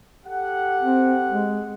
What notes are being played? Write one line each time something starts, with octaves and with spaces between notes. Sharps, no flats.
G4 A4 F#5
C4
G#3